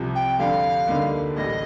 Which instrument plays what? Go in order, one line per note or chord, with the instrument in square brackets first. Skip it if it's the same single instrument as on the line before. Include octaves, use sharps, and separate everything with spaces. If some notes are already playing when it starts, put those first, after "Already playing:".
Already playing: [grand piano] C2 C3 F3
[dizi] G5
[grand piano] F2 D3 G3 D4 [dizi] F5
[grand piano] D2 D3 G3 A#3 D#4
[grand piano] A1 A2 G3 [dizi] D#5